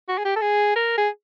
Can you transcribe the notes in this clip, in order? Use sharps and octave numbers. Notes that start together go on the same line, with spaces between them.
F#4
G#4
G4
A4
G#4
A#4
G#4